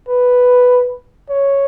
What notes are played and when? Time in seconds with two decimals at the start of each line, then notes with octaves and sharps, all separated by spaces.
0.08 B4
1.30 C#5